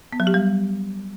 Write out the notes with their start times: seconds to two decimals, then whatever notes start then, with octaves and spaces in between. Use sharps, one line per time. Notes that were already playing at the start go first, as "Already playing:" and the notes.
0.13 B3
0.20 F#3
0.27 G4
0.34 G3